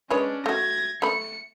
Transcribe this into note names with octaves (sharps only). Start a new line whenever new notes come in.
G#3 C#4 D4 B4 C#5
A3 F#4 G#6 A#6
A3 B5 C#7